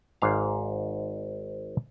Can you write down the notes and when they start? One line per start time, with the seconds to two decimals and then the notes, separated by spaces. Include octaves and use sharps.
0.22 G#1 G#2 F5